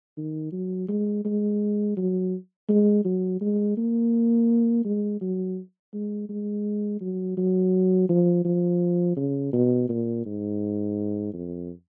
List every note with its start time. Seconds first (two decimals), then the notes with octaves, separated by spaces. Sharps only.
0.17 D#3
0.52 F#3
0.88 G#3
1.25 G#3
1.97 F#3
2.69 G#3
3.05 F#3
3.41 G#3
3.77 A#3
4.85 G#3
5.21 F#3
5.93 G#3
6.29 G#3
7.01 F#3
7.37 F#3
8.09 F3
8.45 F3
9.17 C#3
9.53 B2
9.89 A#2
10.25 G#2
11.33 F2